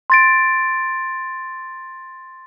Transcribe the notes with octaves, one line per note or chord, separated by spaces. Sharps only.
C6 A6 D7